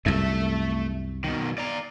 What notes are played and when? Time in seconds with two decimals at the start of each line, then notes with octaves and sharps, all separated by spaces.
0.06 C2 F#2 A3 E5
1.24 B2 D#3
1.58 D5 A#5